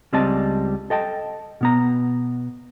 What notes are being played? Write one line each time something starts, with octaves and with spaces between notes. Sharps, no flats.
C#2 G3 C4 D5 D#5 A5
A4 D#5 G5 A5
B2 B3 A#5